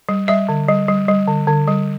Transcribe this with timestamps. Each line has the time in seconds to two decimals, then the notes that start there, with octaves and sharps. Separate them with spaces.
0.09 G3
0.28 G3 E5
0.49 D3
0.69 G3
0.88 G3
1.08 G3
1.28 D3
1.47 D3
1.68 G3